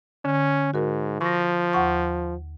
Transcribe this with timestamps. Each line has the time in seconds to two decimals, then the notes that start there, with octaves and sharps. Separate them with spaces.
0.25 D3 C#4
0.74 G#2 F#4 A#4
1.21 F3 C#6 A#6
1.73 D#2 F#5 C#6